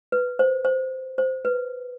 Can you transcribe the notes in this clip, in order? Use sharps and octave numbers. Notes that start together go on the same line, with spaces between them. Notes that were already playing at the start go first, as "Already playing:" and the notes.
B4
C5
C5
C5
B4